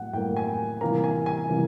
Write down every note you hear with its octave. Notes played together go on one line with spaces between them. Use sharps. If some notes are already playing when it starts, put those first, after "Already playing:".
Already playing: A2 F#3 A#3 F#5
A2 F#3 A#3 G5
G#5
C3 E3 G3 A#3 A#5
G#5
G#5
C3 E3 G3 A#3